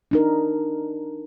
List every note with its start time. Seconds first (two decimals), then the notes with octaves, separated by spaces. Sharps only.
0.11 D4 D#4 A#4